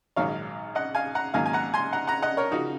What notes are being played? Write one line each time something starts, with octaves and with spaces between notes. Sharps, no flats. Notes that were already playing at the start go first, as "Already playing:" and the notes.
A#1 G#2 D#3 F#3 C#5 F5
D#5 F#5
F5 G#5
F#5 A#5
G#2 D#3 F#3 A#3 F5 G#5
G#5
F#5 A#5
G#5 C6
F#5 A#5
F#5 A#5
D#5 F#5
A#4 C#5
C#3 F3 D#4 F#4